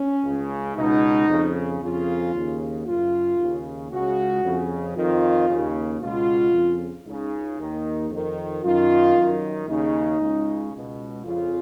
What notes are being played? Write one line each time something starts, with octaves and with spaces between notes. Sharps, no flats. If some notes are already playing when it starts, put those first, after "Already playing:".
Already playing: C#4
C#2 C#3
C#2 B2 D#4
F2 C#3
F2 C#3 F4
D#2 C#3
F#2 C#3 F4
D#2 C#3
C#2 C#3 F#4
F2 C#3
F2 D#3 F4
D#2 C#3
C#2 B2 F4
F2 C#3
C#2 C#3 D#4
D#2 D#3
F2 D#3
F#2 D#3 F4
F#2 D#3
D#2 C#3 D#4
C#2 C#3
C#2 B2
F2 C#3 F4